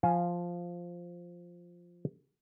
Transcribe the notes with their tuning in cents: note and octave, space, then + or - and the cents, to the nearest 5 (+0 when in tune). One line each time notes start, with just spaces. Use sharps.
F3 +0 F5 +0 G#5 +15